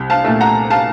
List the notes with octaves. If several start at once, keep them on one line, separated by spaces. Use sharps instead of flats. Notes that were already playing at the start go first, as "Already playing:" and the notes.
Already playing: C2
F5 A5
A#2 A3
F#5 A#5
F5 A5